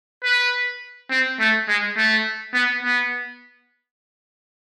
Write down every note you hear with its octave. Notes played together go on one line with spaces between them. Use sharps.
B4
C4
A3
G#3
A3
B3
B3